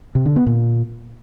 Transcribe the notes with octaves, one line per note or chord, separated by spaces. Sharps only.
C3
D3
B3
A#2